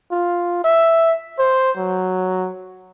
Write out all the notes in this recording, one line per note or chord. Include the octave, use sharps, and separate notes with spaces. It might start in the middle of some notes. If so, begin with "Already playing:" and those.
F4
E5
C5
F#3